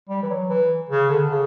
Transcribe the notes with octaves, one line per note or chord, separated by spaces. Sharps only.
G3
E3
F#3
E3
C#3
D3
C#3